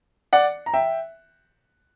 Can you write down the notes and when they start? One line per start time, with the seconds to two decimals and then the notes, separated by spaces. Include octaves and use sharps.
0.33 D5 F#5
0.66 A#5
0.74 E5 G5